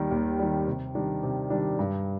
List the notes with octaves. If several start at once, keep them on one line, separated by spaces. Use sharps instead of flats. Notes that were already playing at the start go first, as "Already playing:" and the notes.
Already playing: D#2 D#3 G3
D#2
D#3 G3
C3
D#3 G3 D4
C3
D#3 G3 D4
G2